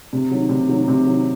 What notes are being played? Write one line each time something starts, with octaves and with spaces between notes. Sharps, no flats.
C3
D#3 F#3
C3
D#3 F#3
C3
D#3 F#3